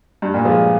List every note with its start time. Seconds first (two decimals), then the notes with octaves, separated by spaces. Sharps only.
0.22 G2
0.34 G2 A#2
0.45 F3 G#3